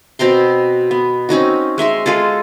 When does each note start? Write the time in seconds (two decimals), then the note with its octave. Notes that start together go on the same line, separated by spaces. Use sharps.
0.19 B2 C4 A#5 C6
0.91 B3
1.29 C4 C#4 D#4 F#4
1.78 G#3 E5 A#5 C6
2.06 G#3 F4 G#4 A4